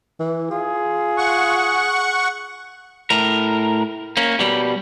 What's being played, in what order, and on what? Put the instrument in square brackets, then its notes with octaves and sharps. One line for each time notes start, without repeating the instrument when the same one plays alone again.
[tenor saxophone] E3
[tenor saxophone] F4 [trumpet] G#4
[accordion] F#5 C#6
[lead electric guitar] A2 A#4
A#3 C#4
B2 G3